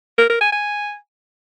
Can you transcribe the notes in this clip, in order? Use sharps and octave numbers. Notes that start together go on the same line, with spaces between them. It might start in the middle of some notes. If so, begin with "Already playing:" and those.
A#4
A#4
G#5
G#5